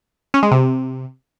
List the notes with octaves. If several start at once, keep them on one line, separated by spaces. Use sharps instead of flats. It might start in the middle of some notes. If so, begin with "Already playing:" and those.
C#4
G#3
C3